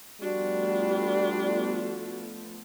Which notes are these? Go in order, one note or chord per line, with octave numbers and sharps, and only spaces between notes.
F3 G3 A3 B3 D4 F#4